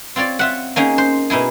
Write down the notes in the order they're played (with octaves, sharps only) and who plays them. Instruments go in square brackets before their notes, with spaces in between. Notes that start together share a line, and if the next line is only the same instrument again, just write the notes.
[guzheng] C4 F4 C#5 D5
F4 E5 F#5
A#3 C#4 D#4 G#4
C5
B2 D#4 E4 G#4